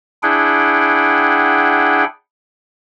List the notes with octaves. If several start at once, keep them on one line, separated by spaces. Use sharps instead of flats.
D4 E4 G#4 F#5 G5